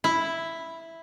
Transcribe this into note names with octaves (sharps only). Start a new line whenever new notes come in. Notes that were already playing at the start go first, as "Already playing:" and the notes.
E4